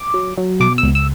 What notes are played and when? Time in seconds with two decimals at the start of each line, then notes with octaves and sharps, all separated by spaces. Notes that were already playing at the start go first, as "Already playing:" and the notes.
Already playing: D6
0.14 F#3
0.38 F#3
0.60 B2 D6
0.78 C#2 E6
0.95 E6